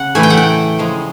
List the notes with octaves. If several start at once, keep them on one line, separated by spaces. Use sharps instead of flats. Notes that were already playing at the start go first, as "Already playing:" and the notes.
Already playing: C#3 F#5
A2 E3 A3 G#5
G5
F#5
G5
C#3 F3 G#3